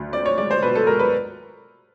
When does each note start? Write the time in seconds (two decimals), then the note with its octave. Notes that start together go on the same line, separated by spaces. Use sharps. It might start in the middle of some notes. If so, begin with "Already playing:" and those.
Already playing: D2
0.13 C4 D5
0.26 C#5
0.38 G#3 D5
0.51 C5
0.63 B2 B4
0.76 A4
0.87 G#3 A#4
0.99 B4